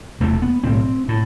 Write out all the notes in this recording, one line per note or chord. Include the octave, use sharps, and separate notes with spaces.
E1 E2 C3 A3
B3
B1 A2 C4
A2